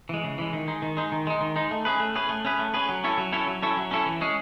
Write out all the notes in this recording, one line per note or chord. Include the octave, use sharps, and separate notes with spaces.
E3 G#3
C#3
E3 G#3
D#3
G#3 D#4
D#3
G#3 D#4
D#3
G#3 D#4
D#3
G#3 D#4
A3
C#4 G#4 B4
A3
C#4 G#4 B4
A3
C#4 G#4 B4
A3
C#4 G#4 B4
F#3
C#4 E4 A4 C#5
F#3
C#4 E4 A4 C#5
F#3
C#4 E4 A4 C#5
F#3
C#4 E4 A4 C#5
E3
G#3 C#4 G#4